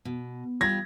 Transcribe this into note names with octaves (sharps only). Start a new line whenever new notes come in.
B2
G3 F4 G#6 A#6